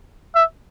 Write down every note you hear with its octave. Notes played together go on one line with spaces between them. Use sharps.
E5